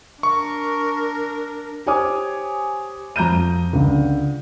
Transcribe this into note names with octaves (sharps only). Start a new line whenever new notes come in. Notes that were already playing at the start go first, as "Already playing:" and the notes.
D4 A#4 C#6
G4 C5 C#5 G#5 D6 D#6
F2 A#5 G6 D#7
C#2 D3